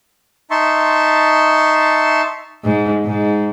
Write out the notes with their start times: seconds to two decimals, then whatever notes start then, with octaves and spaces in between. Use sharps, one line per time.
0.51 D#4 E5 A5 C6 C#6
2.64 G#2
3.05 G#2